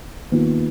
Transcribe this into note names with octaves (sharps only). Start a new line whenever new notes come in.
D#2 D#3 B3 F4